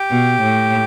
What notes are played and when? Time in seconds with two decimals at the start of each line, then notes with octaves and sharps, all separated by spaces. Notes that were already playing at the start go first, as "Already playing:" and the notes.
Already playing: G4
0.10 B2
0.42 A2